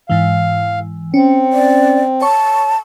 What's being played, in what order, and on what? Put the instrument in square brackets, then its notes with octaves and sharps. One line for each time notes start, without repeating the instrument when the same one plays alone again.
[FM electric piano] G#2 E3 [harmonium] F5
[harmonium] C4 [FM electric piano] C#4
[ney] D5
[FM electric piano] C#5 C#6 [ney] A5